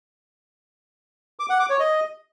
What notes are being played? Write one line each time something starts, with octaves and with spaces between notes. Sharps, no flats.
D6
F#5
D6
C#5
D#5